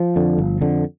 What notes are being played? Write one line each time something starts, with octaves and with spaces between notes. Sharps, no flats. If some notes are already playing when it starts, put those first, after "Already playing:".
Already playing: F3
F2 D3
G1
F2 D3